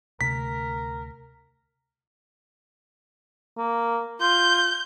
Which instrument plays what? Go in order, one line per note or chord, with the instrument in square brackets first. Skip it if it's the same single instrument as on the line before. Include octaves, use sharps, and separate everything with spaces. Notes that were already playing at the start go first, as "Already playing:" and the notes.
[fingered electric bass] D2 C3 A3 [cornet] A#4 [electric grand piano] B6
[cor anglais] A#3
[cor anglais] F4 [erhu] G6